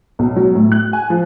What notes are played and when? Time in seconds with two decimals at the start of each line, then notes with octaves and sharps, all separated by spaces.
0.19 B1
0.36 F#3
0.55 A2
0.72 F#6
0.93 G#5
1.10 F3